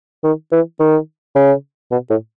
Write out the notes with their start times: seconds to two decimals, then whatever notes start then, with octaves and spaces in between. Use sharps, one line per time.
0.24 D#3
0.52 E3
0.80 D#3
1.35 C#3
1.91 B2
2.10 A2